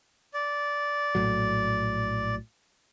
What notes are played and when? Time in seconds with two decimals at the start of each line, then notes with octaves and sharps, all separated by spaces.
0.34 D5
1.15 A#1 A2 F#3